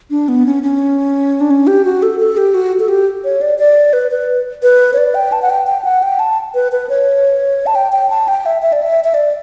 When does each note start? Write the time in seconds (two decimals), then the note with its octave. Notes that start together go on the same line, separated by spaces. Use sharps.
0.10 D4
0.28 B3
0.46 C#4
0.63 C#4
1.41 D4
1.51 C#4
1.67 G4
1.85 F#4
2.03 A4
2.20 A4
2.37 G4
2.54 F#4
2.80 A4
2.88 G4
3.24 C#5
3.41 D5
3.58 D5
3.93 B4
4.11 B4
4.63 B4
4.93 C#5
4.98 D5
5.15 G5
5.32 A5
5.42 F#5
5.50 G5
5.67 G5
5.85 F#5
6.02 G5
6.19 A5
6.55 B4
6.72 B4
6.89 C#5
7.66 A5
7.75 G5
7.92 G5
8.10 A5
8.28 G5
8.46 E5
8.62 E5
8.73 D5
8.82 E5
9.04 E5
9.14 D5